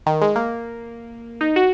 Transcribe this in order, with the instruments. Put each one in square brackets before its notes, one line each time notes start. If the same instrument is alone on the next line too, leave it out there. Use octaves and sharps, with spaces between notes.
[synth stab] D#3
G#3
A#3
D#4
F#4